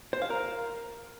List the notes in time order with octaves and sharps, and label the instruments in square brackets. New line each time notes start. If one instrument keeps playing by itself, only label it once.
[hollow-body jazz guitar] C5
F5
A#4